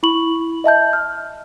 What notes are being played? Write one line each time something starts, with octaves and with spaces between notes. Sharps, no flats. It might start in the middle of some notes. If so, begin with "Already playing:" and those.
E4 B5 C#6 F#7
D#5 E5 A5 G6
F6